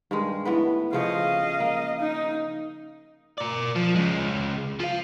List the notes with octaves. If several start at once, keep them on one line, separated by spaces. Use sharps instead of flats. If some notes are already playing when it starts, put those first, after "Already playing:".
G2 D#3 G#3
A2 B3 B4
C#3 F3 C#5 D#5 F5
A#3
D#4
A#4 D5
F3
C#3 G#3
F3 F5